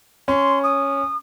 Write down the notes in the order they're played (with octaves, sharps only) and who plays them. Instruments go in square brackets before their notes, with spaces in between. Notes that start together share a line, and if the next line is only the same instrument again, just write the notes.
[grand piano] C#4 [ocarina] C6
[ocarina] D#6